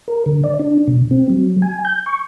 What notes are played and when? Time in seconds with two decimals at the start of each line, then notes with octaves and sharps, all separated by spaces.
0.08 A#4
0.26 D3
0.44 D5
0.59 D4
0.88 B2
1.11 C4
1.30 F#3
1.62 G#5
1.85 G6
2.06 C#6